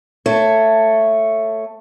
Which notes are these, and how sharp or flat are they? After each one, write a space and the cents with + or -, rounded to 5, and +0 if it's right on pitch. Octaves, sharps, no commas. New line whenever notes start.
A3 +10 C#5 +0